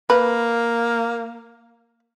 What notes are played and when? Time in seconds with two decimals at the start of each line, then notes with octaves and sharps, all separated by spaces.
0.10 A#3 B4